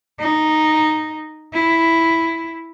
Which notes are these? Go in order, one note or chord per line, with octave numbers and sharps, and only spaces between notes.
D#4
E4